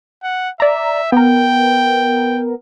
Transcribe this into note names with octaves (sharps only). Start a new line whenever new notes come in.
F#5
D5 E5 A#5
B3 A#4 G5